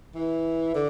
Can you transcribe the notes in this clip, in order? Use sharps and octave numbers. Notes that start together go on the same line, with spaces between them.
E3
D3